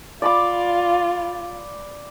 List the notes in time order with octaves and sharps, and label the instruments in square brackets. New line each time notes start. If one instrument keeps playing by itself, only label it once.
[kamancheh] F4 [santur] D5 B5 D6